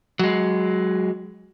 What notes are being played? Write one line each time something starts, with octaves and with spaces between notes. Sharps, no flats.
F#3 G#3